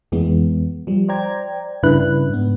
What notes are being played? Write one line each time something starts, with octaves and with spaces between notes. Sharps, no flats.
F2 E3 G#3 B3
F3 G3
C5 D5 G5 A#5 G#6
G2 C#3 D4 E4 B4 F#6
G#2 B3